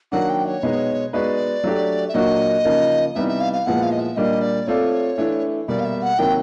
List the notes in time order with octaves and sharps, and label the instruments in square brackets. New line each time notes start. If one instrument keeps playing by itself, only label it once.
[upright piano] D#3 F#3 A#3 D4 [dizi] F#5
[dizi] G5
C#5
[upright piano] B2 G#3 B3 D#4
[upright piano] G#3 B3 D#4 F#4 B4 [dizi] D5
[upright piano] F#3 A3 D4 G4
[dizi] E5
[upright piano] A#2 F#3 A#3 D4 F#4 [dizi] D#5
[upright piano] C#3 F3 A#3 D#4
[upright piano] C3 E3 G3 B3 D#4 [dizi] E5
[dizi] E5
F5
F5
[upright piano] A#2 F3 G#3 B3 E4 [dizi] F#5
[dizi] F5
D#5
E5
[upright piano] A#2 G3 A#3 D4 [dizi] D#5
[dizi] D5
[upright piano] A3 C4 F4 A4 D5 [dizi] C#5
[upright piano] E3 A3 D4
[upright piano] B2 G3 A#3 [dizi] D5
[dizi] F5
E5
F#5
[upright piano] C3 D#3 F#3 A#3 [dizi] G5